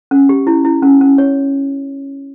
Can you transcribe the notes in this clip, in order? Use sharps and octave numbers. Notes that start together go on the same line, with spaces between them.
C#4
G4
E4
E4
C#4
C#4
C#5